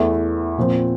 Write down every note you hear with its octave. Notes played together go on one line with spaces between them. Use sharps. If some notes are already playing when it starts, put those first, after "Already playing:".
Already playing: E2 E3 A3 E4
A#2 F3 C4